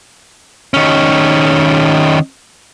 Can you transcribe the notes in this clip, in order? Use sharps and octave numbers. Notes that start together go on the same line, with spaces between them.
D#3 C#4